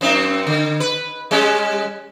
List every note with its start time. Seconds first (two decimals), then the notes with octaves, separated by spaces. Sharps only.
0.01 F#2 C4 D#4
0.47 D3
0.80 B4
1.31 G3 G#3 C#4